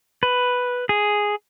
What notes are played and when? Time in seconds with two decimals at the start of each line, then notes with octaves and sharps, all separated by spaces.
0.23 B4
0.89 G#4